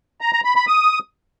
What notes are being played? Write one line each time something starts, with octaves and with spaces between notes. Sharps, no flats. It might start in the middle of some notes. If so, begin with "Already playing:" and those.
A#5
A#5
B5
B5
D#6